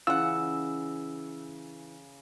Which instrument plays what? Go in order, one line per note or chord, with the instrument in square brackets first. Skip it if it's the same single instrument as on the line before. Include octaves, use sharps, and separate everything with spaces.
[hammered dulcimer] C#3 [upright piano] E3 [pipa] F4 F#5 [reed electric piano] E6